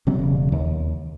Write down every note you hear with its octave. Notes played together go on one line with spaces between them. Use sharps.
C3 F#3 C4 C#4
E1 C#3
D#2